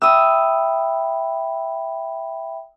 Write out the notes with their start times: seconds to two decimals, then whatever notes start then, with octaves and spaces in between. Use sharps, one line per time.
0.02 E5 G5 B5 D#6 E6